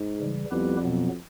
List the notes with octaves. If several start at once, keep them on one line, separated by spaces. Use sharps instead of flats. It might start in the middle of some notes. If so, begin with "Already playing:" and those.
Already playing: G#2
C#3 E3 G3
F2 G3 B3 E4 G4 B4
B2 F#3 B3